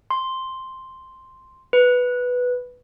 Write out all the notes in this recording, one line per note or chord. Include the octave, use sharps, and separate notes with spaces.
C6
B4